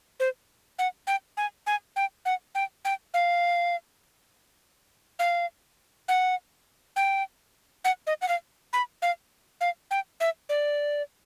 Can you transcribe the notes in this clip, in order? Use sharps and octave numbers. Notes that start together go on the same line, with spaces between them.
C5
F#5
G5
G#5
G#5
G5
F#5
G5
G5
F5
F5
F#5
G5
F#5
D#5
F#5
F5
B5
F5
F5
G5
E5
D5